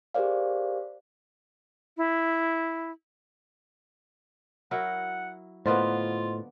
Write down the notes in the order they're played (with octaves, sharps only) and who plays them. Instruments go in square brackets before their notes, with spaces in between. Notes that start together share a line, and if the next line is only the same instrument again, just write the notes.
[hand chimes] G4 G#4 A#4 C5 D5 F5
[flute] E4
[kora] F#3 E4 A#4 [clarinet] F#5
[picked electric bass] A2 [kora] D3 A#3 B3 [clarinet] F4 [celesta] C5 D#5 C6